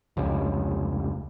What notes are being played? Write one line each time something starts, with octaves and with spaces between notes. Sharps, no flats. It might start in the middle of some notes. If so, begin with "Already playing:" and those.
F1 C#2